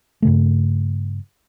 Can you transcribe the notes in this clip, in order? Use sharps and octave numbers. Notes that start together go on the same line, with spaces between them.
G2 C#3 A3